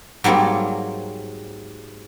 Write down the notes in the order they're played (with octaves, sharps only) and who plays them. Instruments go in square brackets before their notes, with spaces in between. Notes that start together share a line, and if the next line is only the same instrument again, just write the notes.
[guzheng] G#2 F#3 G3 A#3 C4